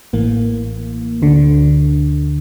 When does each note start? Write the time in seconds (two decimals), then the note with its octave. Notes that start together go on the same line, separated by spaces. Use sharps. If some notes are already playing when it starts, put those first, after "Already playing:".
0.13 A1 A2 E3 A#3
1.22 D2 D3